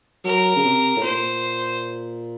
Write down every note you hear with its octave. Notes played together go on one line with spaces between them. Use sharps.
F#3 A#4
C#3
C3
A2
A#2 C5